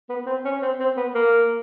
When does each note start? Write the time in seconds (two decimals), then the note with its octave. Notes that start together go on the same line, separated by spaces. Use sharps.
0.09 B3
0.26 C4
0.45 C#4
0.62 C4
0.80 C4
0.97 B3
1.15 A#3